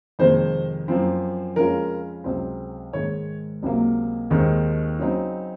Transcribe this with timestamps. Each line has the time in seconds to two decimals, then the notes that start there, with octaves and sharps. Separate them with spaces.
0.19 F2 C3 D#3 G#3 C5
0.88 F#2 F3 C4
1.56 F2 C#3 G#3 C#4 F4 A#4
2.24 C#2 C3 F#3 C4
2.93 G#2 D#3 G#3 C#5
3.63 C#2 C3 F#3 A#3
4.30 D#2 D#3 G#3 C4 D#4
4.99 C#3 F#3 C4 D#4